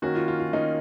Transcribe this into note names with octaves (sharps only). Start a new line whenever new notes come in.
D#3 A#3 C#4 F#4
F4
F4
F4
D#3 A#3 C#4 D#4